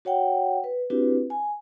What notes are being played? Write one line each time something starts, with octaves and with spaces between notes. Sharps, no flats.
F#4 C#5 F#5 G5
B4
C4 D4 E4 F#4 G4 B4
G#5